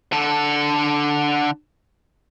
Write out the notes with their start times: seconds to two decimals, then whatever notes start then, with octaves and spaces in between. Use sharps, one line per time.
0.13 D3 A4